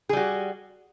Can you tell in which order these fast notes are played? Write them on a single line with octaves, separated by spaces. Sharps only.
G#4 G3 F#4